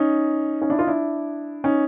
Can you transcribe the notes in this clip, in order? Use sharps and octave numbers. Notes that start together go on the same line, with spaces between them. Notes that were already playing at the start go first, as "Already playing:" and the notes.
Already playing: C#4 D#4
C#4 D#4
D4 E4
D#4 F4
D4 E4
C#4 D#4